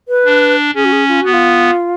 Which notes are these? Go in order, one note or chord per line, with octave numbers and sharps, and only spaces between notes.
B4
D4
C#4 G#4
F#4
G#4
F4
B3 F#4
F4